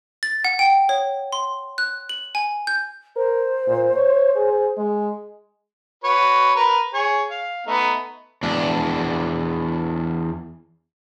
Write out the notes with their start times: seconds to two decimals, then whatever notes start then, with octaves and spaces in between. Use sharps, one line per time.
0.23 A6
0.45 F#5
0.59 G5
0.89 C#5
1.33 C6
1.78 F#6
2.09 F#7
2.35 G#5
2.67 G6
3.16 A#4 C5
3.67 A#2
3.96 C#5
4.36 G#4
4.78 G#3
6.04 F#4 B4 C#5
6.56 A#4 B4
6.94 G#4 C#5
7.30 F5
7.67 A3 B3 D#4
8.43 E2 D4